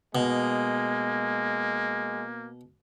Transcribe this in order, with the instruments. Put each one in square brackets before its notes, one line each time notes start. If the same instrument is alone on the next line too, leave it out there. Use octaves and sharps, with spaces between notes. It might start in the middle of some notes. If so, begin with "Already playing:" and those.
[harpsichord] B2 [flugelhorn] G#3 [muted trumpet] A#3